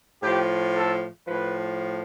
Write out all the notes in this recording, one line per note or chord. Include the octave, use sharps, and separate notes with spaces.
A2 F3 G4
A4
A2 F3 B4